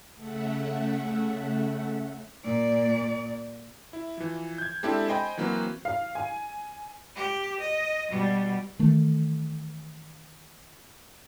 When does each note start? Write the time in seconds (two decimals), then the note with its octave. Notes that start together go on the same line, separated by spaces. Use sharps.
0.15 C#3 A3 E5 F#5
2.44 A#2 D5
3.93 E4
4.18 E3 F3
4.58 G6 G#6
4.83 G#3 C4 D4 E4 G4 A4
5.08 C5 D#5 G5 G#5 B5
5.37 E3 F#3 A#3 C4 F#4 B4
5.85 F5
6.15 G#5
7.16 G4
7.60 D#5
8.10 B2 G3
8.79 D#3 E3 A3